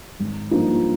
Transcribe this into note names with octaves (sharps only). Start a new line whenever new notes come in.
G#1
G2 F3 A#3 D#4